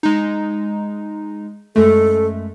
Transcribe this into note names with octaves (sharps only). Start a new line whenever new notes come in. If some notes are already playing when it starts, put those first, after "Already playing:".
G#3 D#4
F#2 G#3 A3 A4